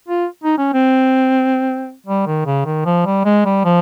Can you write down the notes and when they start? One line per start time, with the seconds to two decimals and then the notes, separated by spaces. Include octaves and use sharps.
0.08 F4
0.44 D#4
0.58 C#4
0.73 C4
2.06 G3
2.27 D#3
2.46 C#3
2.65 D#3
2.85 F3
3.06 G3
3.25 G#3
3.45 G3
3.65 F3